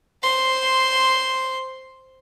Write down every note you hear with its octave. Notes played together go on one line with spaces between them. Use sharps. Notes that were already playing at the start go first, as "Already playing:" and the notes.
C5 C6